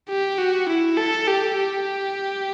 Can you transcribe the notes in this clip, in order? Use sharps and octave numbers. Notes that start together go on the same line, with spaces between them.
G4
F#4
E4
A4
G4
G4